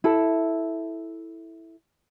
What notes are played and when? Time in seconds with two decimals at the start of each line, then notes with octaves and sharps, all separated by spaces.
0.04 E4 A4